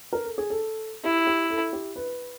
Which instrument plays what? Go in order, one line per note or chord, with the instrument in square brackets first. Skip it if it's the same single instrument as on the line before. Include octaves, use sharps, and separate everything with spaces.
[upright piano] A#4
A4
G#4
A4
[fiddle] E4 [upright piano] G4
[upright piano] G4
A4
G4
B4